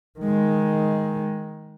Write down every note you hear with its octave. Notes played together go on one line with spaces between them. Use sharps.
D#3 G#3